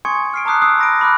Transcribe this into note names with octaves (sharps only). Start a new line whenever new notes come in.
G#5 C6 C#6 D#6 G#6 C#7
F6 C7 D7
A5 A#5 D6 D#6 F#6 C7
D#6 E6 F#6 C7
B5 A#6 D7
B5 D6 F6 F#6